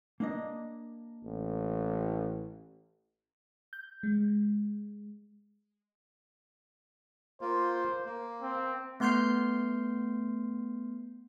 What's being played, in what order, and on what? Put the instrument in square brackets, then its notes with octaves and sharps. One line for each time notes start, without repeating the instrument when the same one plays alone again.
[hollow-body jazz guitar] A#3 D4 D#5
[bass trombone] A1
[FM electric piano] G6
G#3
[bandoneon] A#3 F4 [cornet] C5
[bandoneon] A#3
[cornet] C4
[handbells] A3 B3 C6 F6 G6 C7